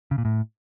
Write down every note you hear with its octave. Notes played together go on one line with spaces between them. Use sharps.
C#3
A#2
A2